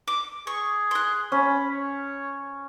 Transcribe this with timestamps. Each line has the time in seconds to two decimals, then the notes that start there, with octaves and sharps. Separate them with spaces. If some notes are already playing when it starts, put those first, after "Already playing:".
0.08 D6
0.47 G#4 C#6
0.91 C6 F#6
1.32 C#4 B5
1.72 C#5